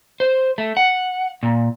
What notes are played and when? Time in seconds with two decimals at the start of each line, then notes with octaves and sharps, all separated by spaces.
0.20 C5
0.58 A3
0.77 F#5
1.43 A#2